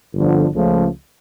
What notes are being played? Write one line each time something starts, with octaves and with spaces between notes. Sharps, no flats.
G1 F2 D3 F3
C#2 C#3 F3 A3